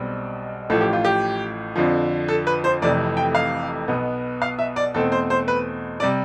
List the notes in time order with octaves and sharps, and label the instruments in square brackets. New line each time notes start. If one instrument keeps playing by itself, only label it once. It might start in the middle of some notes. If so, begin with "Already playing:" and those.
Already playing: [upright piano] B1 B2 G3 C4
A1 A2 F3 A4
G4
F4
G4
F2 D3 F3
A4
B4
C5
F1 F2 C3 E3 A3 D5
G5
F5
B1 B2 B3
F5
E5
D5
E2 B2 A3 C4 A4
C5
C5
B4
C3 G3 D5